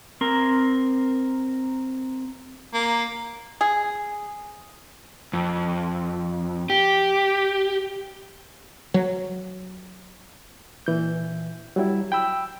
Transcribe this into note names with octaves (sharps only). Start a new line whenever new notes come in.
C4 A#4
A#3
G#4
F2
G4
F#3
A#2 E3 G6
F#3 G3 E4
G5 B5 E6